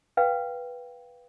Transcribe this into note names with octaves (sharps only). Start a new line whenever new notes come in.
B4 F5 G5